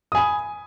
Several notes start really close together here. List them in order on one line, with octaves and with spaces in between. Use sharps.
D#6 G#5 B5